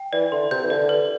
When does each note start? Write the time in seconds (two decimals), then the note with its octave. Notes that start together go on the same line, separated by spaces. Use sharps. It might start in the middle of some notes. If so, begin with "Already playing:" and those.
Already playing: G5
0.12 E3 D5
0.31 D3 C6
0.51 C3 G6
0.63 E3
0.70 D3 D5
0.89 B4